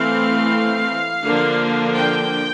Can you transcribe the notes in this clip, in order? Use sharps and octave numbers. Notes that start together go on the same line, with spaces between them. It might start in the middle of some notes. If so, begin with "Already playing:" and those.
Already playing: E3 A3 C4 F5
D3 F3 A#3 D4
G5